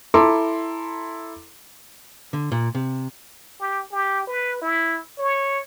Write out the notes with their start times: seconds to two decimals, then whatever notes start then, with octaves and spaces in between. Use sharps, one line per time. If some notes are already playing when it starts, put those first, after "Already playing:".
0.14 E4 A4 A#5 C6 D6
2.33 D3
2.52 A#2
2.75 C3
3.60 G4
3.92 G4
4.27 B4
4.62 E4
5.18 C#5